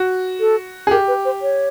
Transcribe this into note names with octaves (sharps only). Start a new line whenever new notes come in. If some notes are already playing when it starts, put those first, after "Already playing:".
Already playing: F#4
A4
G#4
G4 A#4
B4
C5
C#5